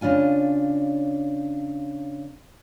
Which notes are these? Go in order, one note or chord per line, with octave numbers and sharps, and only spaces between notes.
C#3 D4 F4 G#5